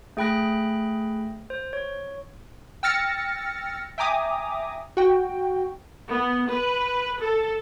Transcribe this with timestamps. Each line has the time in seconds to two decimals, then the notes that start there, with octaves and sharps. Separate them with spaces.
0.17 A3 G#4 G5 B5 F#6 A#6
1.50 C5
1.73 C#5
2.83 G5 E6 F6 A6 A#6 C#7
3.98 E5 G5 G#5 A#5 D6 D#6
4.97 F#4 G5
6.07 B3
6.49 B4
7.19 A4